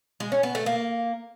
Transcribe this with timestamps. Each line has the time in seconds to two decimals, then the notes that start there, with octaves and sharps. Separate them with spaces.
0.20 G#3
0.32 C#4
0.43 B3
0.55 A3
0.66 A#3